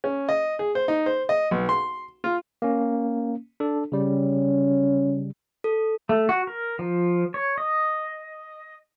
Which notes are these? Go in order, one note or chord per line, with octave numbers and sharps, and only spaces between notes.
C#4
D#5
G#4
C5
D#4
C5
D#5
B1
C6
F4
A#3 C#4
D4 A4
C#3 G3 C#4
A4
A3
F#4
A#4
F3
C#5
D#5